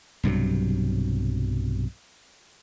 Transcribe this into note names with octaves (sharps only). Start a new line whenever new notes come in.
B1 G2 C3 F#3